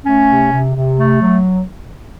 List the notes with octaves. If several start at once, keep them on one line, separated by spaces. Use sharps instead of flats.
A3 C#4
C3
C3
C3
A3
F#3